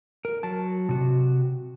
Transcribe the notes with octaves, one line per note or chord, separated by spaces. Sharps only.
A#4
F#3 A5
C3 F#4